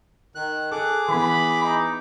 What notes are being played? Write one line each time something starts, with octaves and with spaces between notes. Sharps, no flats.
D#3 F#6
G#4 A4 D6 F#6
E3 B3 B5
D#4